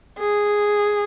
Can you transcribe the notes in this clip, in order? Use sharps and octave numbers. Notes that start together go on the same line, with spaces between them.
G#4